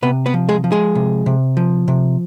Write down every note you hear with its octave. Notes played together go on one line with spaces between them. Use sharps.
C3 B3 B4
B3 B4
F3
G#3 G#4
F3
G#3 G#4
C3
C3
F3
C3